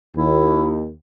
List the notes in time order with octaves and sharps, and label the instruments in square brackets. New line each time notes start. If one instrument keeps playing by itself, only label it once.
[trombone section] D#2 [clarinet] E4